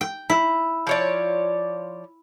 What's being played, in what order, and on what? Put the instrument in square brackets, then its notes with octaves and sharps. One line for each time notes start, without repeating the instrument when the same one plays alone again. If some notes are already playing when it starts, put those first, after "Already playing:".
[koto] G5
E4
[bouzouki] F3 C#5 D5